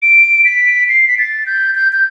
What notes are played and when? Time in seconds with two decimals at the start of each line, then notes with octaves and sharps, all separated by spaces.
0.02 D7
0.45 B6
0.89 C7
1.08 B6
1.18 A6
1.46 G6
1.75 G6
1.92 G6